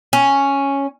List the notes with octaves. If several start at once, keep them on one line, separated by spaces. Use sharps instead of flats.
C#4